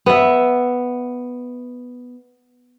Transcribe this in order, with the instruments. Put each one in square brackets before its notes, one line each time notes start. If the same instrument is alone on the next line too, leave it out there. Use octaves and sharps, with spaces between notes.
[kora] B3 E5